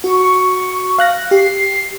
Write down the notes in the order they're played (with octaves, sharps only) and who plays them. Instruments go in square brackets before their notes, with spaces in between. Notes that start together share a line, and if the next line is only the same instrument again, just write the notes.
[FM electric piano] F#4 [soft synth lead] C#6
[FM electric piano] F5 F#6 A#6
[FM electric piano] G4 [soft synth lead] C7